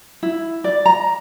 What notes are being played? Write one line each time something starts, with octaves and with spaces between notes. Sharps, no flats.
E4
D5
A#5